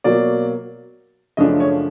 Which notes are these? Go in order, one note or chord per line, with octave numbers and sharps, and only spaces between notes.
B2 F#3 A#3 D5
F#2 C#3 F3 A3 D4 D#5
C#5